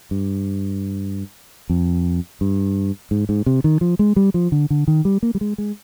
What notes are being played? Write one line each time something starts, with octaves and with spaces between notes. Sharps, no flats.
G2
F2
G2
G#2
G#2
C3
D#3
F3
G#3
G3
F3
D3
D3
D#3
G3
A#3
G3
G#3
G#3